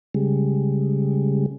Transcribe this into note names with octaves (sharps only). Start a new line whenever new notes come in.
C#3 G3 G#3